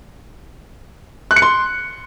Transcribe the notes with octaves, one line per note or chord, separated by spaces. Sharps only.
F#6
C#7
C6